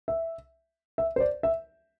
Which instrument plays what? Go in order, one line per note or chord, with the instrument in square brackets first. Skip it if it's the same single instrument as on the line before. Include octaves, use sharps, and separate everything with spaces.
[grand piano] E5
E5
C5
D5
E5